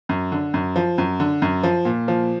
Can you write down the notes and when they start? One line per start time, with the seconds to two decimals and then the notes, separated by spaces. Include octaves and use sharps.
0.09 F#2
0.32 D3
0.54 F#2
0.76 F3
0.98 F#2
1.20 D3
1.42 F#2
1.63 F3
1.85 A#2
2.08 F3